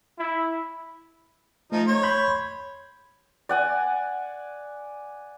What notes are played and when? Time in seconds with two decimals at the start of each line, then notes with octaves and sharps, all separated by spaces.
0.18 E4
1.72 F3 A3 D#4
1.87 C#5
2.03 B5 C6 G6
3.49 D5 F#5 G#5